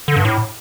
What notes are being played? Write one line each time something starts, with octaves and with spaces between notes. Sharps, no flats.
D3
G2
A2